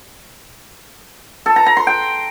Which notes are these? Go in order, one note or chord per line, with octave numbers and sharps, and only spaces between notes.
A4
A#5
A#5
C6
G5